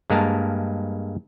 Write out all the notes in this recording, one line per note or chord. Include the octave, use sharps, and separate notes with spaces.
G2 G#3 A#3 A#4 A5